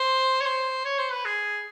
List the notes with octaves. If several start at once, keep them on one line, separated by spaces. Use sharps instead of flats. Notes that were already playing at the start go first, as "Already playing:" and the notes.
Already playing: C5
C#5
C5
C#5
C5
B4
G#4